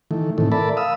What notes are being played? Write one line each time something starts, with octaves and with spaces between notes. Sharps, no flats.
D#3 E3 A3
A2 C3 D#3 E3 A3
A4 A#4 D5 E5 A5 B5
F5 B5 D#6 E6